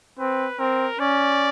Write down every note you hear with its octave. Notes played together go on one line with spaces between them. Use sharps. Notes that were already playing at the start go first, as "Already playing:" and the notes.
C4 B4
C4 A#4
C#4 D5